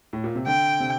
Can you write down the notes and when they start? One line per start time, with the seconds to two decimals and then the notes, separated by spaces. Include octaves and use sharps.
0.13 A2
0.24 A#2
0.35 C3
0.46 D3 G5
0.80 C3